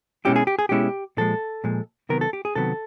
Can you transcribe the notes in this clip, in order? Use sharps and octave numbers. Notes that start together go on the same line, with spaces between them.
B2 G#3 C#4 E4 G4
G#4
G4
G#4
B2 G#3 C#4 E4 G4
A#2 F3 G#3 A4
A#2 F3 G#3
C3 D#3 F#3 B3 A#4
A4
G4
G#4
C3 D#3 F#3 B3 A4